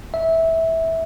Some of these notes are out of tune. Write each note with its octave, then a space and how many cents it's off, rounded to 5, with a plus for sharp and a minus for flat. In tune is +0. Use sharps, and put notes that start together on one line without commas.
E5 -15